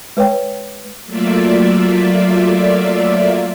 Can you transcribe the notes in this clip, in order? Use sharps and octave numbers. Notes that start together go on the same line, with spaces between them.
G#3 B4 C#5 G5
F#3 A3 A#3 F4 D5 E5